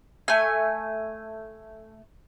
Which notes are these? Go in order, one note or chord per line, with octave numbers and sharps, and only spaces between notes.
A3 G#5